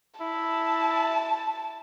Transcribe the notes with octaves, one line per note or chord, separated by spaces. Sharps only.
E4 A5